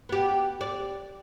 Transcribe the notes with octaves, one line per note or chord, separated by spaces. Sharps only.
B3 G4
D5